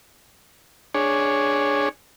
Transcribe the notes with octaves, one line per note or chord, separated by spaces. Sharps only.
D4 G#4 C#5